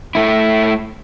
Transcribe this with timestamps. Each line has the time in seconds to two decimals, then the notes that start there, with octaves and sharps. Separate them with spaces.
0.15 A3 E4